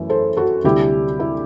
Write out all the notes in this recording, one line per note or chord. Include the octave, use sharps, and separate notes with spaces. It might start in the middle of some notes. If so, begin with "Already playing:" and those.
Already playing: F#2 E3 A3
A4 C5
F#4 A4
D2 C3 G3 E4 G4
E4